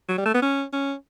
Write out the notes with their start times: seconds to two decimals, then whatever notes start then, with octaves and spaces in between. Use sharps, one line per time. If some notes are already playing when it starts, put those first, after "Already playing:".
0.09 F#3
0.18 G3
0.26 A3
0.34 B3
0.42 C#4
0.73 C#4